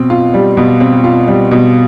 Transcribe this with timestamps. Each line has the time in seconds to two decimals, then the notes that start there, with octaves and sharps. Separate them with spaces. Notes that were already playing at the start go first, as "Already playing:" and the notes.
Already playing: B2 C4
0.10 F4
0.34 G3
0.57 B2
0.80 C4
1.04 F4
1.28 G3
1.51 B2